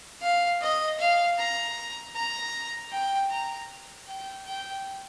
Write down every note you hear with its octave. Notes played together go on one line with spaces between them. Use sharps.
F5
D#5
F5
A#5
A#5
G5
A#5
G5
G5